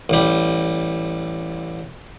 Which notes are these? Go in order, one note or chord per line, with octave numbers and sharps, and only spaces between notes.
A1 G3